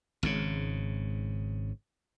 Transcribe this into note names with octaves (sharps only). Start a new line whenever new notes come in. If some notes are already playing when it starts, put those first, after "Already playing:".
G#1 G#2 C#3